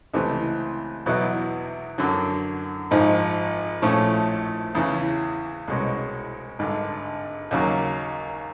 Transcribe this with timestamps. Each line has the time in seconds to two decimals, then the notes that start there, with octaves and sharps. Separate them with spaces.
0.13 C#2 C3 E3 A3 C4
1.06 E2 B2 F#3 B3 E4
1.98 F#2 D3 F#3
2.91 G#1 G#2 F3
3.82 A#1 A2 F3 A3 C#4
4.75 E2 C#3 E3
5.68 C2 B2 G#3 C#4
6.59 G#1 G2 D3
7.51 D#2 C#3 F#3 A#3